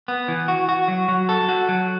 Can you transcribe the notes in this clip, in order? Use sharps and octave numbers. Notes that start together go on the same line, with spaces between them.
B3
E3
F#4
F#4
F#3
F#3
A4
F#4
F#3